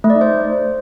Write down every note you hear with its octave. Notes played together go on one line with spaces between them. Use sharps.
A3
D5
D#4
C5